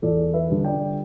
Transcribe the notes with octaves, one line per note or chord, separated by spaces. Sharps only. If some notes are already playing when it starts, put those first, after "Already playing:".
E2 A4 D5
B4 E5
D3 G3
D5 G5